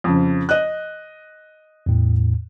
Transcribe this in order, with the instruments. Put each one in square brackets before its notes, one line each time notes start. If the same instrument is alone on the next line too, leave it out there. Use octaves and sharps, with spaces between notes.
[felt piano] F2 C#3
D#5 F#6
[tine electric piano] E2 A2